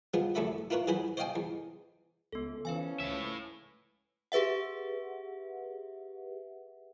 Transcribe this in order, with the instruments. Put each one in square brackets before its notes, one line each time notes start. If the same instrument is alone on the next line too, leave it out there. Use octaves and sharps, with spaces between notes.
[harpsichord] F3 G#3 B3 F4
A1 F#2 A3 C#4 E5 B5
E4 F4 A#4 B4 C#5
E3 F#3 G#4 C5 B5
C5 C#5 D#5 F5 G5 G#5
E2
[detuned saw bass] C#2 [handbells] B3 A4
[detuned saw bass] E3 [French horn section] F3 C#4 [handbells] B4 F5 G#5
[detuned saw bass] C#2 [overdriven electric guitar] A2 E5
[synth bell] G4 G#4 B4 E5 F#5